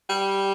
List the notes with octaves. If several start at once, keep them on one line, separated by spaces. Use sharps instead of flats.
G3